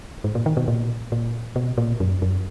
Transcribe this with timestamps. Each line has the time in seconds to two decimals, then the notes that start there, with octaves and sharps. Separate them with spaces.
0.24 G#2
0.35 A#2
0.46 D#3
0.57 B2
0.68 A#2
1.12 A#2
1.56 B2
1.78 A#2
2.00 F#2
2.22 F#2